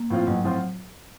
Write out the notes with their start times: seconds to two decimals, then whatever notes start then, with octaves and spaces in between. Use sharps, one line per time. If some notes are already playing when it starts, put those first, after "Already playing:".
Already playing: A#3
0.10 A2 F3 C4 F4
0.27 A1 F#3
0.44 A2 F3 C4 F4